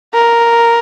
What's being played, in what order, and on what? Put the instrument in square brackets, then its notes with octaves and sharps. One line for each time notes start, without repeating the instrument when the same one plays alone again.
[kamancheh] A#4